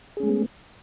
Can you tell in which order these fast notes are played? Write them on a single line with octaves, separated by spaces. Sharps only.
G#4 C#4 G#3 A3 B3